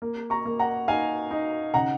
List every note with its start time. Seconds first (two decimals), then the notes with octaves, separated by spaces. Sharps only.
0.02 A#3
0.30 A#5 C#6
0.46 A#3
0.59 F#5 A#5
0.88 D#4 F5 G#5
1.31 D#4
1.74 C#3 F#5 A#5